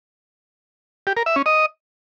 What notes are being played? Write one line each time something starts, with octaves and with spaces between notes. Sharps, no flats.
G4
A#4
E5
C#4
D#5